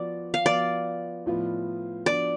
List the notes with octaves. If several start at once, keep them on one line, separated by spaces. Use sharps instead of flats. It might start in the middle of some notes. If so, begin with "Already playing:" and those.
Already playing: F3 B3 F#4 D5
F5
F3 B3 F#4 D5
A2 F3 B3 F4
F3 B3 D4 F#4 D5